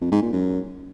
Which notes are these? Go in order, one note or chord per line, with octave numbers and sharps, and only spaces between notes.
F2
G#2
A#2
F#2